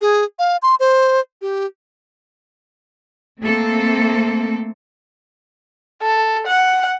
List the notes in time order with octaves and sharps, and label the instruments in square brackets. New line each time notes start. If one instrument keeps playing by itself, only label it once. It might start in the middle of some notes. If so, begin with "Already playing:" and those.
[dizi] G#4
F5
C6
C5
G4
[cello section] A3 A#3 C4 A4
[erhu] A4
F#5